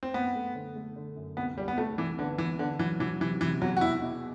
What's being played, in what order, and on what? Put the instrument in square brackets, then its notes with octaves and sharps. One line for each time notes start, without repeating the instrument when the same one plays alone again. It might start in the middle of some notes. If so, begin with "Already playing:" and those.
[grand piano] C4
[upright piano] F#2 [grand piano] B3
[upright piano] A3
D3
A3
D3
F#2
[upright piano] C2 [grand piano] B3
[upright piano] C2 [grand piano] G3
[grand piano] B3
[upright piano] C2 [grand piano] A3
[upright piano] C2 [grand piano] E3
[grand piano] D3 [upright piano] B3
[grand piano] E3 [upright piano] B3
[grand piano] D3 [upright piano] B3
[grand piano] E3 [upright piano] F#3
[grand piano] E3 [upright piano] F#3
[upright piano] C3 [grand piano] E3
[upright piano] C3 [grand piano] E3
[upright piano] E2 [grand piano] F#3
[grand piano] F#4
[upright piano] B2 [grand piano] E4
[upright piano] B2